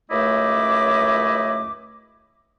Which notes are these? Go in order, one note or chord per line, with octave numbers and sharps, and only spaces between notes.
C#2 F#2 A3 E4 D#5 D6